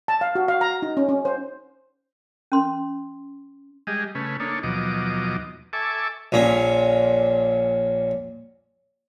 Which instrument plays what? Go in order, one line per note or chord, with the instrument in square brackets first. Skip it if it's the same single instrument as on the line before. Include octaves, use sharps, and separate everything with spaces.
[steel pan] A5
F5
F#4
F5
A#5
D#4
C#4
C#4
C5
[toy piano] C#4 C6
[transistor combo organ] G3 G#3 G4 G#4 D#5
C#3 A3 C#4 B4
A#3 D4 D#4 A4 C#5
D#2 B2 F3 F#3 D#5 D6
A4 E5 G#5 A5 C#6 D6
[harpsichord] A#1 A#2 C#4